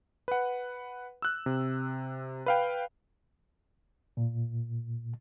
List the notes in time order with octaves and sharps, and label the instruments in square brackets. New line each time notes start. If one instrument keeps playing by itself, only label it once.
[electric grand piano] B4 F#5
E6 F#6
C3
B4 F5 G5
[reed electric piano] A#2